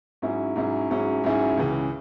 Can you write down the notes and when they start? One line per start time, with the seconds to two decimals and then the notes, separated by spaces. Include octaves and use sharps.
0.22 G#2 F#3 C#4 E4 G#4
0.56 G#2 F#3 C#4 E4 G#4
0.90 G#2 F#3 C#4 E4 G#4
1.24 G#2 F#3 C#4 E4 G#4
1.57 C#2 C#3 E3